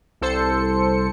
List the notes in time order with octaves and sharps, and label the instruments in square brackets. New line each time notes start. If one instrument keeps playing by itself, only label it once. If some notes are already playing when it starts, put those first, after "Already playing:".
[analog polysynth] C2 A4 C5 C#7